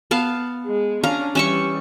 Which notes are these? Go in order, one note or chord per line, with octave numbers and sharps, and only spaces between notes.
B3 F5 A5
G#3
C#4 D4 F5 A#5
E3 G3 C#4 E5 C#6